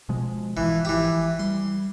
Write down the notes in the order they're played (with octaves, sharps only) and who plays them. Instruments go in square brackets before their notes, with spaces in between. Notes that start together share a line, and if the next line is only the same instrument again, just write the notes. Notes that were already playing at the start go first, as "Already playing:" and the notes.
[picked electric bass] B2 F3 G#3
[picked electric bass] G#1 F3 [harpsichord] E3
[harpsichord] E3 G4
[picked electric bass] G3 [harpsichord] C6